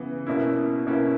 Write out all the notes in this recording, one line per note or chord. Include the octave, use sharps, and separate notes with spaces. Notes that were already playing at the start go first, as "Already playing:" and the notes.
Already playing: C#3 E3 B3
B2 A#3 C#4 E4
B2 A#3 C#4 E4